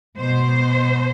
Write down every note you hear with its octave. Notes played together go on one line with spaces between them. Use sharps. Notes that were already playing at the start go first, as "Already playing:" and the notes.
B2 C5